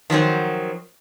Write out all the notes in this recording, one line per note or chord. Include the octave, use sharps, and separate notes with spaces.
D#3 F3 F#3 C4